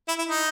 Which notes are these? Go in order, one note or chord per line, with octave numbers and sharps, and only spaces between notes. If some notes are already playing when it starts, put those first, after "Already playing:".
E4
E4
D#4